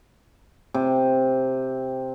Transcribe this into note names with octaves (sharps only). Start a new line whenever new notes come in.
C3